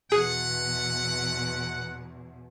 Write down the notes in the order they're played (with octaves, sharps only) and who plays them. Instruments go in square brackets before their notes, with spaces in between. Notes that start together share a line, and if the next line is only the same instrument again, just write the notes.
[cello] E2 B2 [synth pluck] G#4 [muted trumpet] F#5